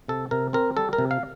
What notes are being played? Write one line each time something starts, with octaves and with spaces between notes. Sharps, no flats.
C3 A4
C3 A#4
C4 A#4
G3 A4
A#4
C3
F5